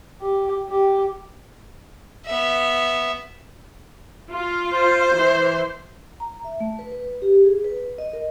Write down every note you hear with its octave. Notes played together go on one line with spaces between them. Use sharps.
G4
G4
B3 E5
F4
C5
E3
A#5
E5
A3
B4
B4
G4
G#4
B4
D#5
A#4